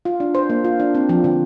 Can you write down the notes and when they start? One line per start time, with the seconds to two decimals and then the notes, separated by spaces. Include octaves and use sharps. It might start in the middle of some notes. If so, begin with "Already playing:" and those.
0.05 F4
0.20 D4
0.35 C5
0.50 A#3
0.64 F4
0.80 D4
0.95 C4
1.09 F3
1.24 D3